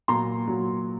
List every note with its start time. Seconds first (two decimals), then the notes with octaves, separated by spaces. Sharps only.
0.08 A#2 F#3 A#5 C6
0.47 A#2 F#3